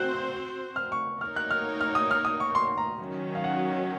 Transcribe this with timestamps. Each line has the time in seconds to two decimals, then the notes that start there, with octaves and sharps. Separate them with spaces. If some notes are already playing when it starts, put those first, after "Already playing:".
Already playing: C4 F#4 C5 F#6
0.76 F6
0.92 C#6
1.21 A#3 D#4 A#4 C#5 F6
1.36 F#6
1.51 F6
1.81 F6
1.95 D#6
2.11 F6
2.25 D#6
2.40 C#6
2.55 C6
2.78 A#5
2.99 D#3 F#3 C#4
3.35 F5
3.44 F#5